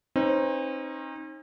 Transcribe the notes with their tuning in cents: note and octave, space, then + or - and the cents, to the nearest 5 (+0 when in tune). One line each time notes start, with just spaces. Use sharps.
C4 +45 D#4 +0 B4 +45